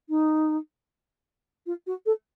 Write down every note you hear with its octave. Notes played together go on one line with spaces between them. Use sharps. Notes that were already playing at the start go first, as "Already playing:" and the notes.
D#4
F4
F#4
A4